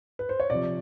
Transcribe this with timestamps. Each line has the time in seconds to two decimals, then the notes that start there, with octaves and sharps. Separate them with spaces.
0.19 B4
0.29 C5
0.40 C#5
0.50 C3 F3 D5